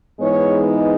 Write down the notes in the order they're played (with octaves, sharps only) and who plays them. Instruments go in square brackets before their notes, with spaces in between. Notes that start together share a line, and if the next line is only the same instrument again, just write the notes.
[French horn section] G#2 E3 G#3 B3 D#4 C#5